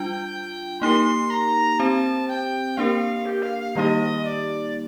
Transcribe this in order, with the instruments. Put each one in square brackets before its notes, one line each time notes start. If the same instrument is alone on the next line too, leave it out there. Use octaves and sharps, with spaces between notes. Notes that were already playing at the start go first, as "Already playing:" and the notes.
Already playing: [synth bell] G3 D4 F4 [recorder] G5
[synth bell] A#3 D#4 G4 A#4 [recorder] C6
[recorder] A#5
[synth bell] C4 G4 C5 [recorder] A5
[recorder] G5
[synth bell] A#3 D4 G4 A#4 [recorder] F5
[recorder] G4
F5
F5
[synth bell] D#3 G3 A#3 D#4 G4 [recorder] D#5
[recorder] D5